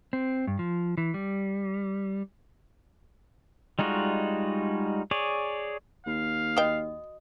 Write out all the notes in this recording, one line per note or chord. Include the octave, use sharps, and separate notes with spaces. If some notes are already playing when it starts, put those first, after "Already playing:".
C4
G2
F3
E3
G3
G3 G#3 D#4 F4 F#4
G#4 C#5 D5
D#2 F5
A#3 F#4 D#5 G5 D#6